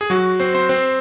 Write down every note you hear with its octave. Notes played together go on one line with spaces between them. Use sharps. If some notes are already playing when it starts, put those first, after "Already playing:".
G#4
F#3 F#4
C4 C5
C4 C5
C4 C5